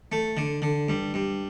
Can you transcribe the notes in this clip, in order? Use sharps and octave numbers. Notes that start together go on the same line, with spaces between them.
A3
D3
D3
G2
G2